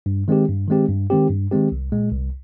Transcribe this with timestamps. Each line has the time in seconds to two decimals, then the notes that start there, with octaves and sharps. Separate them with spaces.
0.06 G2
0.28 D#3 G#3 C4 G4
0.48 G2
0.68 D#3 G#3 C4 G4
0.89 G2
1.10 D#3 G#3 C4 G4
1.30 G2
1.51 D#3 G#3 C4 G4
1.72 C2
1.92 A#2 G#3
2.12 C2